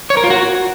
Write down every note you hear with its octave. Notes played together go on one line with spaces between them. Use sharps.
C#5
A#4
F4
F#4